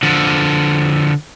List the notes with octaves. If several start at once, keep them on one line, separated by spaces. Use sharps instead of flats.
D3 F3